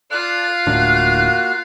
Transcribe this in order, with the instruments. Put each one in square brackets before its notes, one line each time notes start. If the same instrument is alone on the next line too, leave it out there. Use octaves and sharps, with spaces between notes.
[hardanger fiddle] F4 F5 [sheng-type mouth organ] A4 D5 A5 [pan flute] F#6
[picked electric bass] D1 A2 D3 [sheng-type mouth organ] A#3 F#4